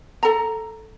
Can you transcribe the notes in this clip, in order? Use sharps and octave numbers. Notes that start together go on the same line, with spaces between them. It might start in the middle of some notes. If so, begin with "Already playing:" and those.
A4 A#5